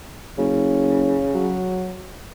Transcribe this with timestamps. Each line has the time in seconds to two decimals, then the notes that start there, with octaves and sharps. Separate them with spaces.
0.38 F#1 C#3
1.34 F#3